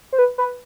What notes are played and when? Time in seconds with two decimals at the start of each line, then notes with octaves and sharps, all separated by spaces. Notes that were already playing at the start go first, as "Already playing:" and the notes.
0.13 C5
0.19 B4
0.38 B4